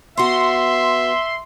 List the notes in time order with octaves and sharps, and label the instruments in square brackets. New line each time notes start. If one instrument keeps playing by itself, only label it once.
[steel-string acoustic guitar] B3 F#4 [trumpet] E5 [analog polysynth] C6